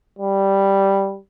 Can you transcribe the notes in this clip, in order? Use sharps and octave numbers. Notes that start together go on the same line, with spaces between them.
G3